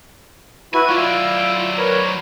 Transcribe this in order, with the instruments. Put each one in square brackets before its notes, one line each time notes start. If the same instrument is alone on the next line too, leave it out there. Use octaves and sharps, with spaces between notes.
[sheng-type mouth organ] E4 F#4 B4 [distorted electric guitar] G#5
[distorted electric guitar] F#3 D5 [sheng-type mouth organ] E4 F4 E6
[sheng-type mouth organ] A#4 B4 C#5
C5